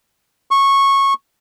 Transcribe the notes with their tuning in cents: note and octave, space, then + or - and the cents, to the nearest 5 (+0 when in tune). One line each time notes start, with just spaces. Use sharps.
C#6 -15